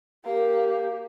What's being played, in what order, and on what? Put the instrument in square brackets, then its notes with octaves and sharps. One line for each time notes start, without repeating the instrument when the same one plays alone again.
[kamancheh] A#3 [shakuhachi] G4